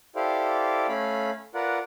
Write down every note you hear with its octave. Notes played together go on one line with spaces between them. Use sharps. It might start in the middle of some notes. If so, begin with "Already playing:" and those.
E4 G4 A4 C5 D5 F5
A3 C#4 F5 B5
F4 A#4 B4 D5 F#5